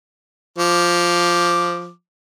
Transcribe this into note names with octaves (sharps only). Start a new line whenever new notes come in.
F3 D6